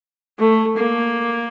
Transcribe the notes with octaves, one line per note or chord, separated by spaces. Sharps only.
A3
A#3